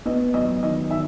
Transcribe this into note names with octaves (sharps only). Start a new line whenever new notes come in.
B3 D#5
F#3 D#5
D#3 D#5
D#3 E5